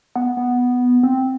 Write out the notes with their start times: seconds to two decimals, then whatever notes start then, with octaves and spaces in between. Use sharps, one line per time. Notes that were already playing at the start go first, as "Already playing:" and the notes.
0.15 B3
0.37 B3
1.03 C4